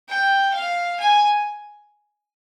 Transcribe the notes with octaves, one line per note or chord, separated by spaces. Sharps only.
G5
F5
G#5